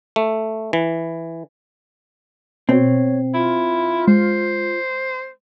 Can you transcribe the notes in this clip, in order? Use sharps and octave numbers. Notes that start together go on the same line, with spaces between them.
A3
E3
B2 C4 C#5
E4 F4
G#3 C5